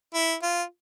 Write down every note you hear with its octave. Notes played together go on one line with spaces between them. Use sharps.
E4
F4